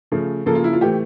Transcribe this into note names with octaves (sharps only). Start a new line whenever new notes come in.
C#3 F3 A3
C#3 F3 A#3 A4
F4
E4
F4
A2 E3 A3 G4